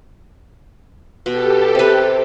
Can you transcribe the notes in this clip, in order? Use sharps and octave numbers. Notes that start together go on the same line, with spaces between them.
B2 G4 A4
C3 B4